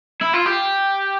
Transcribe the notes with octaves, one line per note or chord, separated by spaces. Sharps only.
E4
F4
G4